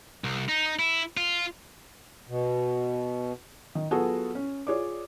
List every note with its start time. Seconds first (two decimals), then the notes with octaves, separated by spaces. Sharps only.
0.24 C2
0.49 D#4
0.79 E4
1.17 F4
2.29 B2
3.75 D#3
3.91 F#3 B3 F4 F#4 G#4 A4
4.35 C#4
4.67 F4 G#4 C#5 D5 D6